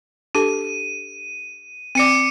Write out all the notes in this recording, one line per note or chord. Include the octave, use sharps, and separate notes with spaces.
D4 G4 A4 D#7
C4 D5 D6 C#7 D#7